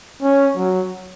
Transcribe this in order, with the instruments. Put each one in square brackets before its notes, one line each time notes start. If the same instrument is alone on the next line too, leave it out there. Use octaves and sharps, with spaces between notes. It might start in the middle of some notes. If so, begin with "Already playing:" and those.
[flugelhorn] C#4
F#3